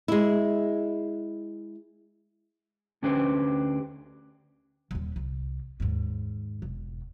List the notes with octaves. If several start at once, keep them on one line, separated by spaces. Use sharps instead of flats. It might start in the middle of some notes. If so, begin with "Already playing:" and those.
G#3 E4
D2 C#4 D4 G4 B4 C5
D#1 D#2
C2
D#2 G#2
E1